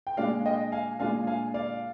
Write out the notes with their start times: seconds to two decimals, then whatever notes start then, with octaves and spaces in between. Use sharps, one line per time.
0.07 G5
0.17 A#2 G#3 D4 F4 D5 F5
0.46 D#5 G5
0.72 F5 G#5
0.99 A#2 G#3 D4 F4 F5 G#5
1.27 F5 G#5
1.54 D5 F5